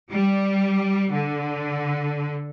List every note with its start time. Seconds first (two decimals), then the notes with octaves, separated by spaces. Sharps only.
0.11 G3
1.12 D3